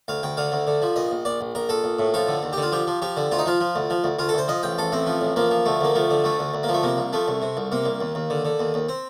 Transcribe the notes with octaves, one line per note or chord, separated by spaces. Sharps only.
D2 F5
D2 G5
D3 F5
D2
D3
F3
A#1 D#5
A#1
A#1 D5
A#1
A#1 A#4
A#1 A4
A#1
A2
F3 A4
D3
D#2
G4
D3 F4
F3 G4
F3
F3 G4
D3
D2 F4
D#4
F3 F4
F3
D2
F3
D2
D2 F4
A4
D2 C5
F3 D#5
A1 G5
A1 A4
A2 C4
F3
A1
F3 A#3
F3
D2 A3
D2 A#3
F3 A3
D3
D2 A3
D2
D2
A#3
F3
A3
C3 A#3
C2
F3 A3
C2
C3
C2
C3 A#3
C2
D#2
D#2
D3
D3
D#2
D#2
C4